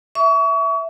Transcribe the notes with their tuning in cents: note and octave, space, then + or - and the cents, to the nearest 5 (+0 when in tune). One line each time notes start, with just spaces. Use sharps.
E5 +0 C#6 +35